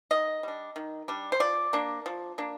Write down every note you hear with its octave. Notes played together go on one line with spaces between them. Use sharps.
D#3 D#5
G3 D4
D#3
G3 D4
C5
F3 D5
A#3 D4
F3
A#3 D4